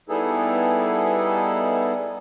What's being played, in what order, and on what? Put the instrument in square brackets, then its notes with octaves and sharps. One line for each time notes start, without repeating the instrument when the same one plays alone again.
[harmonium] G3 B3 D#4 E4 G#4 A4